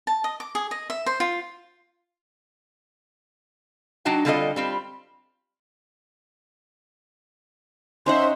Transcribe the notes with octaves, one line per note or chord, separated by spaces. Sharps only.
A5
D#5
D6
G#4
D#5
E5
C5
F4
F#3 D4 D#4 F#4 G5
D3 G3 C4 F4 A4 D#5
G3 C4 F4
C#4 D#4 C5 E5 F#5 C6